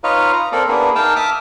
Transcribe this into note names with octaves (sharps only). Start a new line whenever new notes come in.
D#4 F4 B4 C#5 D#5 F5
A#5
A#3 C4 A4 A#4 D5
A#3 B3 D4 E4 G#4
A#3 D#4 F5 G5 A5
E5 A5 D6 D#6 F6